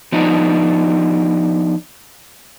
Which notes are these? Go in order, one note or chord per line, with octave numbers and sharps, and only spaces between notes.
F3 B3 D4 D#4